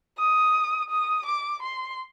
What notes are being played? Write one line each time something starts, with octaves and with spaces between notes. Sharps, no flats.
D#6
D#6
D6
C6